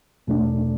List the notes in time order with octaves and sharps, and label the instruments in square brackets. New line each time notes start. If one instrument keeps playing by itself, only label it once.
[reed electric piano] E2 B2 A3 D4